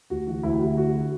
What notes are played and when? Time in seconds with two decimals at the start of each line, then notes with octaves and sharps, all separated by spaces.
0.10 D2 F#4
0.27 E3 F#4
0.43 D2 E4
0.53 G4
0.60 D2 F#4
0.77 D3 F#4
0.95 D3